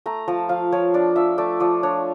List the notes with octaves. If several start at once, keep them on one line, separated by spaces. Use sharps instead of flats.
A3 A#5
F3 A5
F3 F5
F3 C#5
D4 D5
F3 E5
A3 D5
F3 D5
D4 C#5